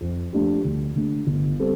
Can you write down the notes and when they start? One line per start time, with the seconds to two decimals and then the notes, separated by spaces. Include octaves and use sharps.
0.01 F2
0.33 F3 A3 D4 G4
0.65 D2
0.96 D3 A3
1.27 G1
1.59 G3 C4 A4